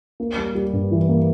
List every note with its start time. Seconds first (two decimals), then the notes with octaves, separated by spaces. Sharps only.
0.20 A#3
0.37 G3
0.55 G3
0.73 G2
0.91 E3
1.09 A#3